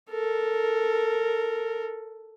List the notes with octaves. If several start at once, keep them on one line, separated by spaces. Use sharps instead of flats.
A4 A#4